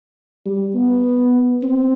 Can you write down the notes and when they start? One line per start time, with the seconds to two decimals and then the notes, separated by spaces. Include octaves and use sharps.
0.45 G3
0.75 B3
1.63 C4